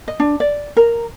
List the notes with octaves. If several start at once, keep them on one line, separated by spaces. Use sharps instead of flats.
D#5
D4
D5
A#4